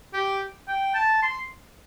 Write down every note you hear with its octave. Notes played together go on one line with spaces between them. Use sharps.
G4
G5
A5
C6